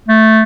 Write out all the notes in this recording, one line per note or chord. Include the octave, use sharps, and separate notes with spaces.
A3